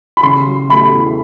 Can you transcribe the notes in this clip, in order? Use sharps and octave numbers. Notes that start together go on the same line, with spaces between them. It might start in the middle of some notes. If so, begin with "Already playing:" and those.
B5
C#3 C6
F#3
A3 B5
E2